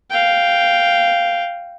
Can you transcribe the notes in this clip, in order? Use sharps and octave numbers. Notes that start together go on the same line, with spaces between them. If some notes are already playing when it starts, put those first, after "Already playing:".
F5 G5